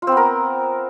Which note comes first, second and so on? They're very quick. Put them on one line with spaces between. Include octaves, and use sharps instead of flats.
F4 C4 B3 A#4